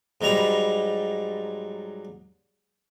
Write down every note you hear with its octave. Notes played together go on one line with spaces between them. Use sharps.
G#2 F#3 G3 A#5 B5